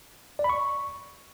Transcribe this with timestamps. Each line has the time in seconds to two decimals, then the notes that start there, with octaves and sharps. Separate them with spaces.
0.39 D5
0.44 B5
0.49 C#6